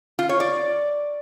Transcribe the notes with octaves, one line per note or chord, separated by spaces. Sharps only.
F4
C#5
D5